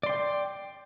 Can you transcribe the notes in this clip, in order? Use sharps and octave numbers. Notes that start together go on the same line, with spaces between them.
D5 G5 C6